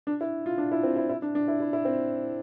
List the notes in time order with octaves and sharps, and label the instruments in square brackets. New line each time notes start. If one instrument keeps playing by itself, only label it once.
[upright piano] D4
E4
F4
D4
E4
C4
E4
E4
D4
D4
E4
E4
E4
C4